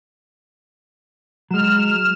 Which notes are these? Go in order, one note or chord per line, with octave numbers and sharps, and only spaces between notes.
F#3 G#3 F6 E7